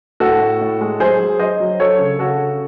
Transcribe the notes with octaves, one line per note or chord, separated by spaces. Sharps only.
A2 F#4 A4
A2
A2
G#3
F#3 G#4 C5
F#3
F#3 C5 D#5
F#3
F#3 A4 C#5
C#3
C#3 F#4 A4
C#3